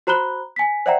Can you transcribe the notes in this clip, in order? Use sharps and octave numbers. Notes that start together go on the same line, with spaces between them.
F#4 C5 A#5 B5 F#6 G7
G#5 B6
C5 D5 E5 F#5 G5 A#5